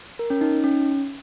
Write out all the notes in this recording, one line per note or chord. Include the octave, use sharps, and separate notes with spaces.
A#4
C#4
D#4
D#4
C#4